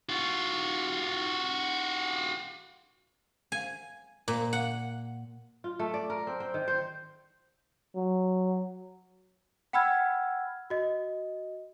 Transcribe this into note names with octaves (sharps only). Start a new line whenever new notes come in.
F4 F#4
G#5
A#2
F#5
F4
A3
D5
A#4
C4
C4
D#3
C5
F#3
F#5 G5 B5 E6 F6 G#6
F#4 D#5